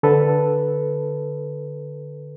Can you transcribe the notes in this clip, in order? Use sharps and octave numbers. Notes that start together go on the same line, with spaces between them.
D3 A4 B4